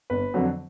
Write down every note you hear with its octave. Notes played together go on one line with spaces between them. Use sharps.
G1 B4
F2 D3 F#3